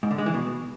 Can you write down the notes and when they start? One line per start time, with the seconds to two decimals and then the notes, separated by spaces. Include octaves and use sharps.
0.03 G#2
0.11 D3
0.18 G#3
0.26 E3
0.34 B2